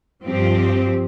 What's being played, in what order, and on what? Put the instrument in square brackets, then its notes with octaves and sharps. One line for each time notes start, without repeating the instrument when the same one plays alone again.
[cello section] G2 F3 C4 G4